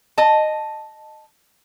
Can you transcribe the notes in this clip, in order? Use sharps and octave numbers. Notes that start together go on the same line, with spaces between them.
D#5 A5